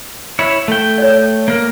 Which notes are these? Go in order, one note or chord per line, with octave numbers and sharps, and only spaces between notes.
E4 C#5
A3 G5
C#5 D5
A#3 A#4